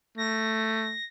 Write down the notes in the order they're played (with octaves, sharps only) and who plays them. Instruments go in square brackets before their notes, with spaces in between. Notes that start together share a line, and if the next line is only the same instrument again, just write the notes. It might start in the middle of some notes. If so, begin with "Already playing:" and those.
[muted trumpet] A3 [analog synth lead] A#6